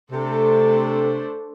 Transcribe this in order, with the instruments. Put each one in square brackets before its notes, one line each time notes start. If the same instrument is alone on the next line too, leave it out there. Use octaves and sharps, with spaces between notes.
[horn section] C3 [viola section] A3 D4 A4 C5